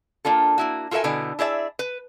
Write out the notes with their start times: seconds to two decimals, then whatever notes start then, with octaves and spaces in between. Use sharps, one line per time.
0.25 A#3 D4 F4 A4
0.58 A#3 E4 F#4
0.91 F4 F#4 A4 A#4 E5 G#5
1.04 B2 D3 E4 G#5
1.39 E4 G#4 D5 E5
1.79 B4